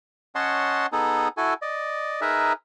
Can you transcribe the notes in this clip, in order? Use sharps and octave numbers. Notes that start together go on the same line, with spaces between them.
C#4 C#5 D#5 F#5 A5 C6
B3 D#4 G#4 A4
E4 F#4 A4 G#5
D5 D#5
D#4 G#4 A#4 B4 E5